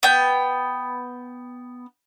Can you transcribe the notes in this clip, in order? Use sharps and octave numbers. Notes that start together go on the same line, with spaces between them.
B3 G5